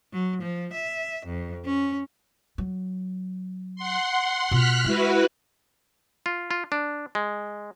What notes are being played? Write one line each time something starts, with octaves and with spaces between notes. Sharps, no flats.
F#3
F3
E5
F2
C#4
F#3
F#5 C6
B2 F4 F6 F#6 B6
G#3 E4 F#4 B4
F4
F4
D4
G#3